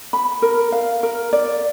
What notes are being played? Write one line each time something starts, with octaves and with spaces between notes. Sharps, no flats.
B5
A#4
F5
A#4
D5